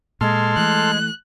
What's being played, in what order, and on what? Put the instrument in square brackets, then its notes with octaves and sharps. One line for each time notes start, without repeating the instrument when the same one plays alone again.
[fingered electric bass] A#2 [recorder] G#3 [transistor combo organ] A4 C6 F6
[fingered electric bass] E3 A3 [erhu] F#6